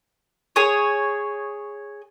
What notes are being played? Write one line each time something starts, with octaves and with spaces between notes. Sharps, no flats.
G#4 C#5